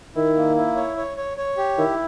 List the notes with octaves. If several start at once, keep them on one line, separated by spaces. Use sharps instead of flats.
D#3 E4
A#3
E4
C#5
C#5
C#5
C#5
G4
D#3 E4